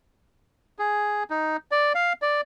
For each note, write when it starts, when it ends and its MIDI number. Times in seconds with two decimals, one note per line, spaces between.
0.79 1.23 68
1.30 1.57 63
1.71 1.93 74
1.95 2.13 77
2.22 2.41 74